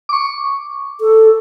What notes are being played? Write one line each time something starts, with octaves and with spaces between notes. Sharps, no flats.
C#6 D6
A4